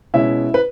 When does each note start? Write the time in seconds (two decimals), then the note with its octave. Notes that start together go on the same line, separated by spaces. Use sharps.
0.14 B2 G#3 C#4 E4 E5
0.54 B4